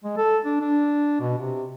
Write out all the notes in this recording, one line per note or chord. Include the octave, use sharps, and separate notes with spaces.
G#3
A4
D4
D4
B2
C3